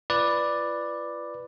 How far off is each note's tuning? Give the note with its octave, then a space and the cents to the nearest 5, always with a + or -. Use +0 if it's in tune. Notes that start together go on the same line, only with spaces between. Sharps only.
F4 -40 B4 +0 D5 +5